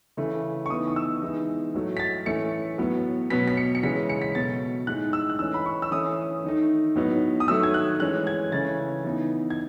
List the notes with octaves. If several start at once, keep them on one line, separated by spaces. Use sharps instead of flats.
C#3 E3 A3
C#6
E3 B3 D#4 D#6
D#6
E6
E3 G#3 B3 D#4
A2 F#3 A3
B6
A6
A2 E3 A3 C#4 C#7
A2 F#3 B3
B2 F#3 B3 B6
B6
C#7
C#7
C#3 E3 G#3 C#4 B6
C#7
B6
B2 F#3 A3 A6
A2 G#3 D#4 F#6
E6
F#6
E3 A3 C#4 E6
B5
C#6
E6
E3 A3 C#4 D#6
D#3 A3 D#4
A2 F#3 B3 D#4
D#6
D#3 F#3 A3 E6
G#6
F#6
E3 G#3 C#4 F#6
G#6
C#3 E3 A3 C#4 A6
E3 B3 D#4
G#6